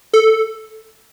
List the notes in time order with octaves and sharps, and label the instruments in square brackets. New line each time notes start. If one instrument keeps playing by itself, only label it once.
[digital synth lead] A4